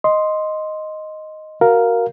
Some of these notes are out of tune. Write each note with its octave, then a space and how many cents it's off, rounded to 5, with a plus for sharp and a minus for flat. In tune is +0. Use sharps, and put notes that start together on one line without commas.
D#5 +0 C6 +0
F#4 +10 A#4 +0 F5 +0